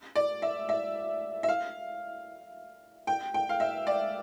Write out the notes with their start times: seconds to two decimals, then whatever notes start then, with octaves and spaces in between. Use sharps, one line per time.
0.16 D5
0.42 E5
0.69 E5
1.43 E5
1.49 F5
3.07 G5
3.34 G5
3.49 F5
3.60 E5
3.87 D5